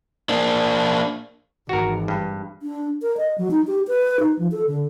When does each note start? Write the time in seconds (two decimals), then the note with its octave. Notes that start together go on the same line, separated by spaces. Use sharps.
0.29 A#3 D4
1.69 G#1 E3 F#4 A#4
2.08 G2
2.62 D4
3.02 A#4
3.17 D#5
3.38 F#3
3.51 D#4
3.67 G4
3.88 B4
4.20 D#4
4.39 F3
4.52 A4
4.67 D3